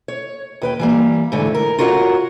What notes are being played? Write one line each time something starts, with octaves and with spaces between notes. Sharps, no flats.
C#5
D#2 B4 G5
E3 G3 A#3
G#2 D3 E3 A3
A#4
F4 F#4 A#4 C#5 E5 F#5